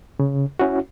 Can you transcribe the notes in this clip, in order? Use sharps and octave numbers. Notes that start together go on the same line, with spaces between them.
C#3
C#4 E4 F#4